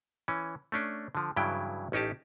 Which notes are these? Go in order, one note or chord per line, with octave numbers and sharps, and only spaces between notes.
E3 C#4
A3 C#4 D4
D3 F3
G2 C#3 E3 F#3 E4 G5
A1 C#4 D#4 G4 A5